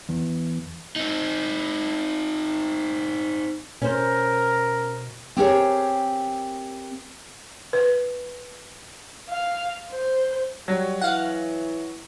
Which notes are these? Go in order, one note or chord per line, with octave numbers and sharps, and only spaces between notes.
E2
C4 D#4
B2 C#4 A#4 C5
C4 G4 G#4 A#4 C5 C#5
B4
F5
C5
F#3 G3
E3 F5 F#5